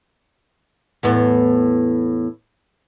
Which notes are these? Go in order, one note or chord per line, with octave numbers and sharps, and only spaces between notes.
E2 A2 B3